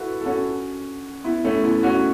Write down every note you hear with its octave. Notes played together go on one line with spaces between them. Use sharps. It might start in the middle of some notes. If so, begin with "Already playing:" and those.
Already playing: E4 F#4 A4 B4
A4
C#4 F#4
B3 E4
A3 C#4
B3 E4
C#4 F#4